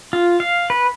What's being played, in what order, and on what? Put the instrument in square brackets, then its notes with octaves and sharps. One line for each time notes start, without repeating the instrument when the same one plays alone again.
[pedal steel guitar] F4
F5
B4